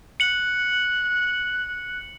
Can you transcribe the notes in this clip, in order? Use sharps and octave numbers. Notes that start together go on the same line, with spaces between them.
F#6 C#7 F#7